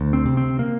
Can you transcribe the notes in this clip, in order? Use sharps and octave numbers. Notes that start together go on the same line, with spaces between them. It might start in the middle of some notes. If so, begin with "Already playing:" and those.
Already playing: D2
C4
C3
C4
A#3